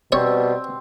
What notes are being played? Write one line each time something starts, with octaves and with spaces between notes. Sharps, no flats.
B2 G3 C4 C#5